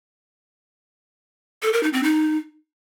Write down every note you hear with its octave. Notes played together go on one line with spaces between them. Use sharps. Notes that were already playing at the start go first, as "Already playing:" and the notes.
A4
A#4
D#4
C4
D#4